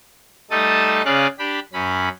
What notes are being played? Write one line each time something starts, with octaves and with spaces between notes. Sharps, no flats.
G3 A3 D#4 A4 A5 D#6
C#3 C#4 G#4 D5 F5 F#6
D4 G4 B5
F#2 C#4 B5